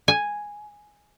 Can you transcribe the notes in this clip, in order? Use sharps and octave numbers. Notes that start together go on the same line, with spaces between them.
G#5